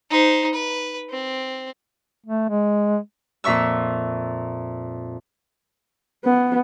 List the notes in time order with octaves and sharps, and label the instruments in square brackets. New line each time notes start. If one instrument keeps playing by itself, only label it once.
[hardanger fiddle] D#4 C5
B4
C4
[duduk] A3
G#3
[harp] F2 A#2 E5 C#6 E6
[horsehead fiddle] B3